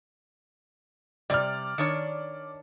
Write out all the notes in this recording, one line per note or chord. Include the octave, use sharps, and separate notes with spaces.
C3 G3 D5 F6
D#3 D4 C#5